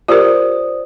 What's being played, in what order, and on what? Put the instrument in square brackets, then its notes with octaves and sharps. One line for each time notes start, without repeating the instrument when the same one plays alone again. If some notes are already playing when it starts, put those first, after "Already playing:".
[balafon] F4 G4 A#4 [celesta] C5 D5 D#6